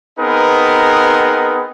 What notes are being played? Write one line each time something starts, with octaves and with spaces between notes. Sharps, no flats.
B3 C4 D#4 G#4 A#4 B4